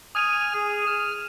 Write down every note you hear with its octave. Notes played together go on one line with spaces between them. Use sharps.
G#5 D#6 F6 D#7 F7
G#4
F6 E7